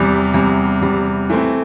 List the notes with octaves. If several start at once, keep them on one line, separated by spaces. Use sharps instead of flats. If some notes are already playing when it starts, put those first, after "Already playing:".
Already playing: E2 C3 G3
E2 C3 G3
E2 C3 G3
E3 A3 C4